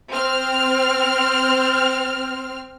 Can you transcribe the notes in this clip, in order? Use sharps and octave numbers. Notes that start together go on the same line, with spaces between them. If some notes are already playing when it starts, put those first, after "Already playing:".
C4 F6